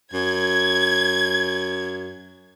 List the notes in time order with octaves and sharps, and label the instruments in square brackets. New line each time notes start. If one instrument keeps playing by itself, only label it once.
[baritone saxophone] F#2 [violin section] G#6